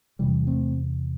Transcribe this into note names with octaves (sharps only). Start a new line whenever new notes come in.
E2 C3 E3 G3
A3 C4